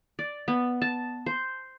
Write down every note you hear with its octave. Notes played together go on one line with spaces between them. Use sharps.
D5
B3
A5
C5